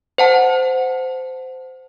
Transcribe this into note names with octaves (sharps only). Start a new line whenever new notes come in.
C5 F#5 A5